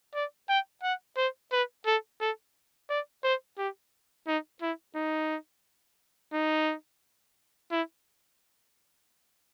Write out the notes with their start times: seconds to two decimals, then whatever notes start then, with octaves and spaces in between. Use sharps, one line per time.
0.14 D5
0.49 G5
0.83 F#5
1.17 C5
1.52 B4
1.86 A4
2.20 A4
2.89 D5
3.24 C5
3.58 G4
4.27 D#4
4.61 E4
4.95 D#4
6.33 D#4
7.71 E4